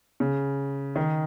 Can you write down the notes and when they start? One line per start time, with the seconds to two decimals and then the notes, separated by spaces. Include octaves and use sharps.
0.20 C#3
0.96 D#3